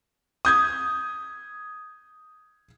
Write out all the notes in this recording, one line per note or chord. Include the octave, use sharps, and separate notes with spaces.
D#6 G6 G#6